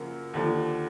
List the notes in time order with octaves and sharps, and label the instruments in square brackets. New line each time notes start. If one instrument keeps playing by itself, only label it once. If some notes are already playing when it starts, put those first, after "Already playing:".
Already playing: [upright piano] F#2 C#3 F3 A#3
D#2 D3 F3